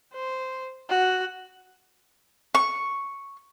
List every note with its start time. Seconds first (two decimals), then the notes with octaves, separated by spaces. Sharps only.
0.13 C5
0.89 F#4
2.55 C#6